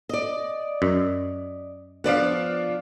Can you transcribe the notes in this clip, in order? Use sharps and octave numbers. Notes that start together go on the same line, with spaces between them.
D5 D#5
F#2
F3 B3 D4 D5 F5 F#5